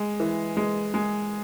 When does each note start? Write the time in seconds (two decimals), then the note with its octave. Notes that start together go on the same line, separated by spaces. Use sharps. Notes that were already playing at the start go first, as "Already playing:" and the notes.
Already playing: G#3
0.20 E3
0.57 G#3
0.94 G#3